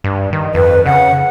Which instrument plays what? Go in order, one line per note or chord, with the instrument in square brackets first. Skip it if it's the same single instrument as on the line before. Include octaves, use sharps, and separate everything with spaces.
[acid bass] G2
D#3
[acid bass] F2 [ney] B4
[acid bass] C#3 [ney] F#5